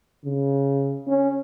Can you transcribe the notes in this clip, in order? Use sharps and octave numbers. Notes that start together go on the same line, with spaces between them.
C#3
C#4